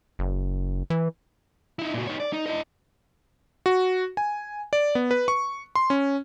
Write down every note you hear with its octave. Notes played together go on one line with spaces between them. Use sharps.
F#1
E3
D#4 E4
A#2 F#4
D#4 C#5
D5
D#4
E4 D#5
F#4
G#5
D5
B3
B4
C#6
C6
C#4